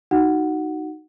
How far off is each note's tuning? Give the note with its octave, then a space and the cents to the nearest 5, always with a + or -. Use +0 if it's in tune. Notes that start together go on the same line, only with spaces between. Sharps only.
D#4 -5 F#4 +15 F#5 +0